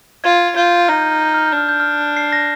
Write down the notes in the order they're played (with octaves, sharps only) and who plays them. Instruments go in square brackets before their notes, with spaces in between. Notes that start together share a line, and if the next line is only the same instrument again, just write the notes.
[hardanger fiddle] F4 [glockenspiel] G#6
[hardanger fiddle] F4 [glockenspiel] G6
[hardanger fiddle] D#4 [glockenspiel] F6
[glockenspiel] G6
F6
G6
F6
G6
[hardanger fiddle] D4 [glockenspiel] F6
[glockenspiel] G6
F6
C7
A#6